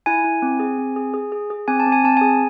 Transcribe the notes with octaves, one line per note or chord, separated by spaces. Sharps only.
E4 G#5
E4
C4
G#4
C4
G#4
G#4
G#4
G#4
C4 G#5
A5
C4
G#5
C4 A5
G#4 G#5